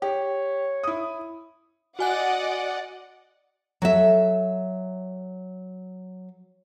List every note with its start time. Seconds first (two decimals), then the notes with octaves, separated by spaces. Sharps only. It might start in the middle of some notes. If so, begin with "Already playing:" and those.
0.02 G4 C#5
0.84 E4 D#6
1.99 F#4 D5 D#5 F#5 G#5 F#6
3.82 F#3 A4 E5